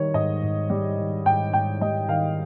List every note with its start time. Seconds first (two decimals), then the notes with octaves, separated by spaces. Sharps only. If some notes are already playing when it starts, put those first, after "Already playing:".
Already playing: D#3 G3 C#5
0.14 G#2 D#5
0.43 G#2
0.70 G3
0.97 D#3
1.25 G#2 G5
1.53 G#2 G5
1.81 G3 D#5
2.08 D#3 F5